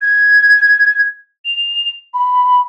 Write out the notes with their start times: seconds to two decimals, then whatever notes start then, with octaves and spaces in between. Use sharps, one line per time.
0.02 G#6
1.45 F7
2.14 B5